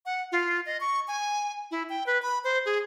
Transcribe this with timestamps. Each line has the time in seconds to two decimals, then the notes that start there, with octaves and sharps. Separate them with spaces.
0.06 F#5
0.32 F4
0.66 D#5
0.80 C#6
1.08 G#5
1.71 E4
1.90 G5
2.07 B4
2.22 B5
2.44 C5
2.65 G#4